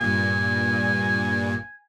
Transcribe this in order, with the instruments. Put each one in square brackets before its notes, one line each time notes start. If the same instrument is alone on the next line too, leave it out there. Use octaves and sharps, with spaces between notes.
[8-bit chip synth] G2 A#2 [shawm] G#5